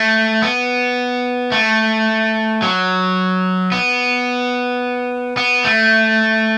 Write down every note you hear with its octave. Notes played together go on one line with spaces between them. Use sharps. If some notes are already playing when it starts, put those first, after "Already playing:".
Already playing: A3
B3
A3
F#3
B3
B3
A3